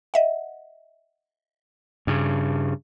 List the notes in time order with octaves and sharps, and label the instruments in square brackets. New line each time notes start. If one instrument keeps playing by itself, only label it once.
[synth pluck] D#5 E5 F#5
[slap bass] G2 C#3